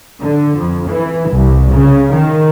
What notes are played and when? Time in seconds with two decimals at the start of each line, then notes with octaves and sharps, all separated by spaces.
0.22 D3
0.58 F2
0.90 E3
1.32 C2
1.72 C#3
2.13 D#3